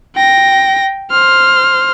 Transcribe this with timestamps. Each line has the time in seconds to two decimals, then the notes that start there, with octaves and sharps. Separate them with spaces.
0.15 G5 A#6
1.11 C5 F6